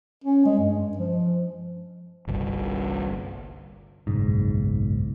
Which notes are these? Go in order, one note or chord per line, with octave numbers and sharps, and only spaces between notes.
C#4
G#3
G2
F3
G1 C2
F#1 B1 G#2